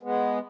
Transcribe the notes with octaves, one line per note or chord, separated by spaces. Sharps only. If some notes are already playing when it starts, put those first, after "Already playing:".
G#3 B3